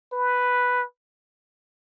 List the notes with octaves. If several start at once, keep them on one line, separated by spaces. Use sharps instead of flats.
B4